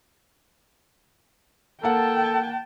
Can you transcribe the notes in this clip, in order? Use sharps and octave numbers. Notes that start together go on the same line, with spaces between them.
A#3 A4 F#5 G5 A5